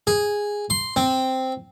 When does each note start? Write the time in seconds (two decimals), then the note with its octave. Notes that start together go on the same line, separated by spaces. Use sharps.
0.07 G#4
0.70 C6
0.96 C4